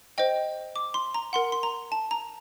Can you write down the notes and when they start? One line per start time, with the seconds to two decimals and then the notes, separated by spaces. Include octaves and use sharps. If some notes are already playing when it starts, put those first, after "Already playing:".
0.18 C5 D#5 G5
0.76 D6
0.94 C6
1.14 A#5
1.33 A#4 F#5 C6
1.52 C6
1.63 A#5
1.92 A5
2.11 A#5